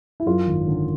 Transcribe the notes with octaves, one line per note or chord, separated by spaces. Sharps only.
E4
F#2 F4
G#1
D3